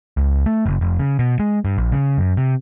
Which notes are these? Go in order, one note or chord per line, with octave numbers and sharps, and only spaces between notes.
C#2
A3
F#1
F1
C#3
B2
G#3
G2
A#1
C#3
F#2
C3